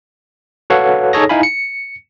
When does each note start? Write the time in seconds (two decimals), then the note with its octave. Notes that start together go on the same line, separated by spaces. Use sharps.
0.70 F#4 A4 B4 C#5 F5 F#5
1.13 D#4 G#4 A4 C#5 D#6 A#6
1.29 D#4 E4 F5 G#5 B5
1.43 C#7